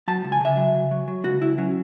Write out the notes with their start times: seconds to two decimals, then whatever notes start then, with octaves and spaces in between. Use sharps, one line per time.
0.08 F#3 A5
0.24 C#2
0.32 G#5
0.41 C#3 E5
0.57 F#3
0.74 C#3
0.91 F#3
1.08 F#3
1.24 C#2 F#4
1.41 C#2 E4
1.58 F#3 C#4